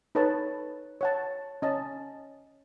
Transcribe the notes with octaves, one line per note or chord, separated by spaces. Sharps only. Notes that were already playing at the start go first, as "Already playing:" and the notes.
D#4 A4 B4 C#5 A5
C#5 F#5 A5
C#4 D#5 A5